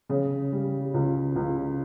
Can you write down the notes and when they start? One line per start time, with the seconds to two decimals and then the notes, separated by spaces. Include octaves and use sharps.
0.09 C#3
0.52 G3
0.94 C#2
1.36 C#2